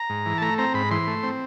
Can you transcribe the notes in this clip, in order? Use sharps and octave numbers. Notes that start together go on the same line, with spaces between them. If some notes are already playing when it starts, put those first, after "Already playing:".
Already playing: A#5
G#2
E3
A5
A3 A#5
C4 A#5
G#2 B5
E3 C6
A3
C4